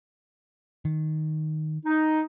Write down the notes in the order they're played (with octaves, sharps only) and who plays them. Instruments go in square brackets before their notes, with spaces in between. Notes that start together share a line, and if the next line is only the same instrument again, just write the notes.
[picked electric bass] D#3
[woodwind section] D#4